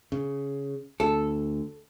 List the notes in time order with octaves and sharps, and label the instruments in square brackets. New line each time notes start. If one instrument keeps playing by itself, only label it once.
[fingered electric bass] C#3
[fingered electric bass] D2 [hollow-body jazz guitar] A4